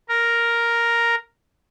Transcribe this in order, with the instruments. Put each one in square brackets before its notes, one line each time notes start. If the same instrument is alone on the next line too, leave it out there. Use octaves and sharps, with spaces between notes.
[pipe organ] A#4